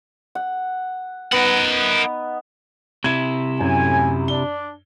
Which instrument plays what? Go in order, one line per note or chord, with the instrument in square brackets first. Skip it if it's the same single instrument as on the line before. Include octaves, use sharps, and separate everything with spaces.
[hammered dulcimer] F#5
[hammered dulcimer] B3 D#4 [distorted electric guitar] A#4 F#5
[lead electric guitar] C3 E4 [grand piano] G#6
[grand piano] F#2 [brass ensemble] A2 G#5
[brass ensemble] D4 [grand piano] G7